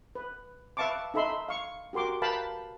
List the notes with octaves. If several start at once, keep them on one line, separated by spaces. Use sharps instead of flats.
B4
B4 E5 F5 A5 C#6 D6
D#4 A4 E5 B5 C6
F5 C#6
F#4 G4 A#4 C6 D6
A#4 B4 F5 G5 A5 B5